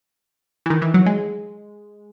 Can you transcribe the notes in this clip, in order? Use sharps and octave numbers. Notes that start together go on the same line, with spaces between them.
E3
D#3
E3
F#3
G#3